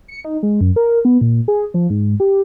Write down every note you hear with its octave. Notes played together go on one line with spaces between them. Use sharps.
C#7
D#4
G#3
F#2
A#4
B3
A#2
G#4
F3
G#2
G4